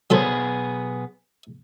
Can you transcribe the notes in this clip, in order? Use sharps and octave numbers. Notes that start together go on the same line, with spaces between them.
B1 F#3 B3 G#4 A4 C5